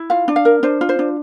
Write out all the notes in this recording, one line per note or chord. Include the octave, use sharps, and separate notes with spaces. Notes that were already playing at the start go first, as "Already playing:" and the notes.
Already playing: E4
F4 F5
D4
F5
A#4
D4 C5
F4
C5
D4